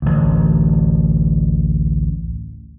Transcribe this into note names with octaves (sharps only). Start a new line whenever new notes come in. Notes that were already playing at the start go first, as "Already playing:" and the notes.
A1 D2